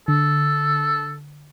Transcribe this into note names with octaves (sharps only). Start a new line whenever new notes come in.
D3 A4